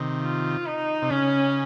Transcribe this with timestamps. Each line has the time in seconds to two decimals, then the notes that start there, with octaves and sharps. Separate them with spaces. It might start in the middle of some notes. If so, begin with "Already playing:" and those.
Already playing: C3 D#3
0.22 F4
0.66 D#4
1.02 C3
1.10 C#3 C#4